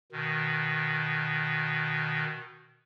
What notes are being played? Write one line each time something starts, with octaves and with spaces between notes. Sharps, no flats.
B2 D#3